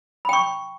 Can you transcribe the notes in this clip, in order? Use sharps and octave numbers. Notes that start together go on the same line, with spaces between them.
G5 B5 C#6